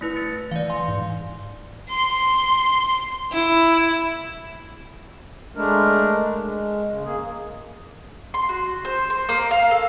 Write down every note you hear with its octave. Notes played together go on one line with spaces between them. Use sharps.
A3 E4 B4
A6 C#7
E3 D5 F5
F5 G#5 C6
G#2
C6
E4
G#3 A3 D4 A#4
G#3
C#3
A#3 G#4
C6
F#4
C5
C5
A#3
F5
A4